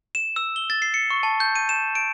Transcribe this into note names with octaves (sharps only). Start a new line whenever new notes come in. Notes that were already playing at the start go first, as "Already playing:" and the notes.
E7
E6
G7
A6
C7
C#7
C#6
A5
G6
D#7
E7
D7